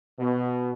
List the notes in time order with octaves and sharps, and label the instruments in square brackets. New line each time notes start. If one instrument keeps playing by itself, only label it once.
[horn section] B2